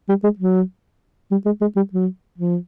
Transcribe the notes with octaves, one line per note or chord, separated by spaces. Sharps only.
G3
G#3
F#3
G3
G#3
G#3
G3
F#3
F3